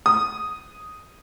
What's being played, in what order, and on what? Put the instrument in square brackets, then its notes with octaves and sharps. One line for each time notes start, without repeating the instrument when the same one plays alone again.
[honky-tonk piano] D#6